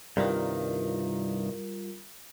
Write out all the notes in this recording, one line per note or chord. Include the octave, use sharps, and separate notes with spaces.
C2 G2 D#3 G3 F4 A#4